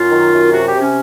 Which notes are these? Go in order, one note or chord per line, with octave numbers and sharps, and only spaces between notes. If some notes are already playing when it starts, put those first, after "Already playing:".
Already playing: F#2 F4
D#3
F#2
C3 F#4
G4
C3
C#4